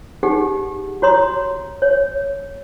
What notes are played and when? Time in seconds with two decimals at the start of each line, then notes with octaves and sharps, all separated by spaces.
0.23 D#4 G4 G#4 F#5
1.02 F#4 C#5 A#5 C6 D#6
1.82 C#5